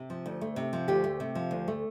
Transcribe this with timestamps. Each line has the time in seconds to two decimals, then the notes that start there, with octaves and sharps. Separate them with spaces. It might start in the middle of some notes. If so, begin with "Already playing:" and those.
Already playing: C3
0.10 F3
0.26 D2
0.41 A3
0.56 C3
0.73 F3
0.88 D2 G4
1.04 A3
1.20 C3
1.35 F3
1.51 D2
1.68 A3